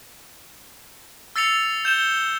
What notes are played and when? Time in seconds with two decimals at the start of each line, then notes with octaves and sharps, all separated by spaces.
1.36 E6 A6 C7 C#7 F7
1.85 G6 E7 G7